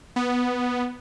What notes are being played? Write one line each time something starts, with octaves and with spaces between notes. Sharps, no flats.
B3